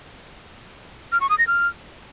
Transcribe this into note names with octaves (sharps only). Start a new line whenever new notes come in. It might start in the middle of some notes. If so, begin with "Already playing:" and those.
F6
C#6
D#6
A#6
F6